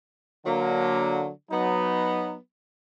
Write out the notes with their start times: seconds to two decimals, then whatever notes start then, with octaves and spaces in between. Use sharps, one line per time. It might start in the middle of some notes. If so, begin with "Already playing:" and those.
0.44 D3 F#3 A#3
1.50 F#3 B3 D#4